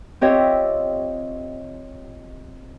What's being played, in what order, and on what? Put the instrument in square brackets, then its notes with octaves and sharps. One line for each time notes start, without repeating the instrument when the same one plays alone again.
[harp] C4 F4 G4 C#5 D#5 E5